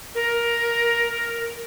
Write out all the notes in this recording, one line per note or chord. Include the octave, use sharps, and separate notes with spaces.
A#4